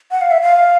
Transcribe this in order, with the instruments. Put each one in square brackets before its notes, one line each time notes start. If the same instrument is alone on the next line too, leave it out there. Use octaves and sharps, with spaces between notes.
[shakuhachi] F#5
F5
E5
F5